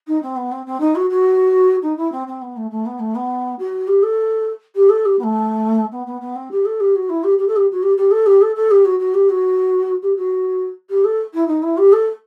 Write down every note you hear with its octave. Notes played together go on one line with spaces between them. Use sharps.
D#4
C4
B3
C4
C4
D#4
F#4
F#4
D#4
E4
C4
C4
B3
A3
A3
B3
A3
B3
F#4
G4
A4
G4
A4
G4
B3
A3
B3
B3
B3
C4
G4
A4
G4
F#4
E4
G4
G4
A4
G4
F#4
G4
G4
A4
G4
A4
A4
G4
F#4
F#4
G4
F#4
G4
F#4
G4
A4
E4
D#4
E4
G4
A4